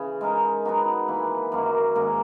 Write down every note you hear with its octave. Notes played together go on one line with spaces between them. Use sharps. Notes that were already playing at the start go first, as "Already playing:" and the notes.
Already playing: C#3 E3
G#3 D#4 A#4
F#3 B3 D#4 F#4
E3 A#3 E4 B4
F#2 D#3 F#3 A#3
G#2 D#3 A#3 C#4